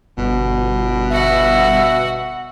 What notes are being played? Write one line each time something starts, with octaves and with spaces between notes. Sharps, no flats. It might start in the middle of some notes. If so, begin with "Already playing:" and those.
G1 B2
F#4 E5 F#5